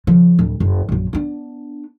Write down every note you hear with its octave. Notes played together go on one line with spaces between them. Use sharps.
C#3 F3
D1
F#1
A#1 F#2
B3 D4